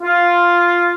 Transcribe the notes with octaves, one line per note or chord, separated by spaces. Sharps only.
F4